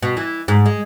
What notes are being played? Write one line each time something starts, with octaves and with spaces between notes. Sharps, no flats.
B2
E3
G#2
G#3